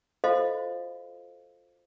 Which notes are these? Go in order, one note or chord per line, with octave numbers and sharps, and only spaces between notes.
F4 F#4 A4 C5 D#5 F5